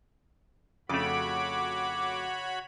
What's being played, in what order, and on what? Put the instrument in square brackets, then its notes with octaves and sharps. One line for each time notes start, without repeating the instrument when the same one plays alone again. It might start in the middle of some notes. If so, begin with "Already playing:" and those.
[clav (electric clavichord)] F2 A3 [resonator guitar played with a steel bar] C#3 [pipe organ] F#4 C#5 B5 [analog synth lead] D6